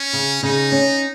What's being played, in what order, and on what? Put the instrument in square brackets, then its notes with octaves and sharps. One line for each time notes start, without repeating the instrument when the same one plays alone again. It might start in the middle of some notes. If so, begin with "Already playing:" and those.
Already playing: [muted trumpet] C#4
[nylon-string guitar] C#3
[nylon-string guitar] C#3 [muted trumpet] D#4
[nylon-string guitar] C#4